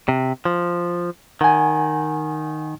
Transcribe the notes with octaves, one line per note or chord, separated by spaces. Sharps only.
C3
F3
D#3 F#5 G#5